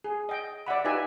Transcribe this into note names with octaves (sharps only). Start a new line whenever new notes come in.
G#4
D#5 G5
D5 E5 F#5 B5
D#4 F4 G4 B4 E5 G#5